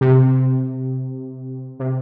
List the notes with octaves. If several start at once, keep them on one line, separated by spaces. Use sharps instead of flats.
C3
C3